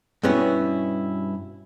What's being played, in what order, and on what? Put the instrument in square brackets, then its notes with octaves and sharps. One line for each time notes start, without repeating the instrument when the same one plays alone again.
[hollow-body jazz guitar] G2 B2 B3 C#4 E4